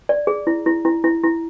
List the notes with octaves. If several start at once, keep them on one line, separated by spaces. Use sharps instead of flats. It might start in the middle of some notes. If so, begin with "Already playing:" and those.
D5
G#4
E4
E4
E4
E4
E4